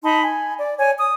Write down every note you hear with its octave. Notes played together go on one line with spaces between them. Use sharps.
D#4 A5 B5 C6
G#5
D5
C#5 G#5
D#6